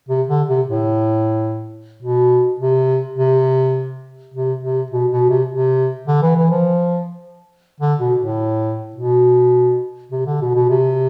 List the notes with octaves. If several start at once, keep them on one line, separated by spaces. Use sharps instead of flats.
C3
D3
C3
A2
B2
C3
C3
C3
C3
B2
B2
C3
C3
D3
E3
E3
F3
D3
B2
A2
B2
C3
D3
B2
B2
C3